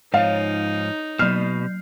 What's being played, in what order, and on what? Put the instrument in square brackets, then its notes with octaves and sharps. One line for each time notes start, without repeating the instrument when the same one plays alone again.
[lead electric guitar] G#2 F3 [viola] D#4 [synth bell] C#5 [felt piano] F5
[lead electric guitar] B2 [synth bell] F#3 G6 C7 [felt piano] F6